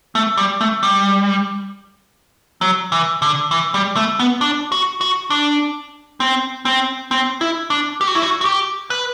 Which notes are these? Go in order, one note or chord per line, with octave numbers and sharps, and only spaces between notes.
A3
G3
A3
G3
F#3
E3
D3
E3
G3
A3
B3
D4
F#4
F#4
D4
C4
C4
C4
E4
D4
G4
F#4
E4
F#4
F#4
G4
B4